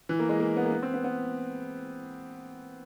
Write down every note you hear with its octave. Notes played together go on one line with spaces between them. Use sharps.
E3
A#3
G#3
A#3
B3
A#3
B3
C4
B3
B3